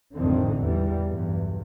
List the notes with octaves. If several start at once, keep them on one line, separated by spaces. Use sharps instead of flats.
A1 F2 G#2 D3 D#3 C4
E2 E3 G3
B1 E2 G2